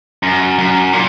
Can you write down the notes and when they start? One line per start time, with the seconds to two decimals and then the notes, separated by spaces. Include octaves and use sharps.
0.23 F#2
0.58 F#2
0.93 A#2